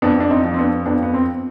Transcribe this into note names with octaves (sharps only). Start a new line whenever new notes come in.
F2 B3 D4
D4
C4 D#4
F3
C4
B3 D4
F2 B3 D4
B3
C4